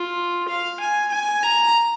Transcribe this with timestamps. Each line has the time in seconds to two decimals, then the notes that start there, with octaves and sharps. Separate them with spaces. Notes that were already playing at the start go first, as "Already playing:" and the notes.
Already playing: F4
0.49 F5
0.80 G#5
1.12 G#5
1.43 A#5